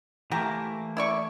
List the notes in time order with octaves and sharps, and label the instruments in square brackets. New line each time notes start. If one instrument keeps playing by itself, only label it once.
[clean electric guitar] E3 A3 A#3 [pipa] G4 A#5
[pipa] E4 D5 C#6